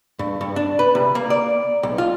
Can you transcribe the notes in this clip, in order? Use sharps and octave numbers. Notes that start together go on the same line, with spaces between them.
G2
G2
D4
B4
C3
A#3
D5
B1
F4